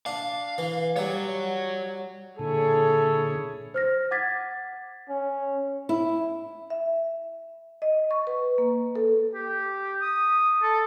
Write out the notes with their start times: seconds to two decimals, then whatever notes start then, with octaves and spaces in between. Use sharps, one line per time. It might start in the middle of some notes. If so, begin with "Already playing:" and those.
0.06 D4 F5
0.58 E3
0.97 G3 C#5 F#5
2.39 A#2 D3 E4 G#4 A4 C#5
3.74 C5 F6 A#6
4.11 F#5 D6 G#6 A6 B6
5.09 C#4
5.89 E4
6.70 E5
7.82 D#5
8.11 C#6
8.27 B4
8.58 A#3
8.96 A4
9.34 G4
10.02 D#6
10.63 A4